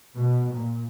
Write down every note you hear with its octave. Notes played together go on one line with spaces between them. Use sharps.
B2
A#2